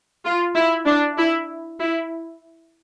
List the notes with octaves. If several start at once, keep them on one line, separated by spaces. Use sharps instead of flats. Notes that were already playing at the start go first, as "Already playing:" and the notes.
F4
E4
D4
E4
E4